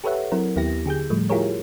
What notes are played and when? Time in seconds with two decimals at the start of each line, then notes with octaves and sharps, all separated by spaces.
0.04 G4 A4 B4 C#5 E5 F#5
0.32 F#3 C4 E4 A#4
0.56 D#2 B3 E4 G4 A#6
0.86 D3 G4 G#4 G6
1.10 A2 F3 G3 A3
1.29 E4 F4 G4 G#4 A#4 C#5